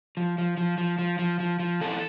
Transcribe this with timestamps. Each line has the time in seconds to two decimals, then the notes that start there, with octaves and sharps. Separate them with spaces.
0.17 F3
0.38 F3
0.57 F3
0.78 F3
0.99 F3
1.19 F3
1.40 F3
1.59 F3
1.81 E3 A4